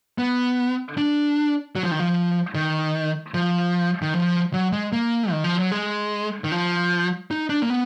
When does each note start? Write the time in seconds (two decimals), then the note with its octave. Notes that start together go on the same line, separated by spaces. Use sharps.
0.18 B3
0.97 D4
1.75 F#3
1.84 F3
1.91 D#3
2.00 F3
2.55 D#3
3.34 F3
4.02 D#3
4.14 F3
4.53 F#3
4.72 G#3
4.93 A#3
5.31 D#3
5.44 F3
5.59 F#3
5.72 G#3
6.44 D#3
6.52 F3
7.31 D#4
7.49 D4
7.62 A#3
7.70 B3